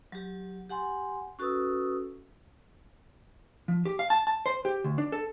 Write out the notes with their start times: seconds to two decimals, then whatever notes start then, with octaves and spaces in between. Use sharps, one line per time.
0.12 F#3 G4
0.70 G4 F#5 G#5 C6
1.39 C#4 F#4 A4 B4 D#6 E6
3.68 F3
3.85 G4
3.99 F5
4.10 A5
4.27 A5
4.46 C5
4.65 G4
4.84 D2
4.98 D4
5.12 A4